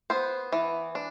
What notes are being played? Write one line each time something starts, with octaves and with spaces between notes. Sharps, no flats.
B3 C5
E3
D4